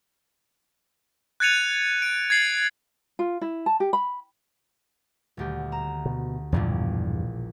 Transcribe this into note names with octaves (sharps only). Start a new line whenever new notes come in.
F#6 G#6 A6 C#7 D#7 F7
D7
G#6 A6 C7 F#7
F4
E4
A5
G4
B5
D#1 D2 G4
A#5 E7
B2
E1 A#1 E2 G2 A#2 G3